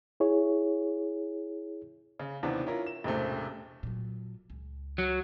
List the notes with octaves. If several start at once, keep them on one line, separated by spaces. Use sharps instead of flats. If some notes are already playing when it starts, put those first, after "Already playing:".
E4 G#4 C#5
C#3
D#2 C3 E3 B3 D4
C#4 E4 F4 A#4
E7
E1 A1 C3 A3
A#2 F#3
C#2
F#3